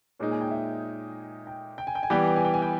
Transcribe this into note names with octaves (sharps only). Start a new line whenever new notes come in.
A#2 G#3 D#4 C#5
G#5
G5
E5
G5
G5
G#5
G5
G#5
E3 G3 B3 G4 G5
G#5
G5
G#5
G5
G#5
G5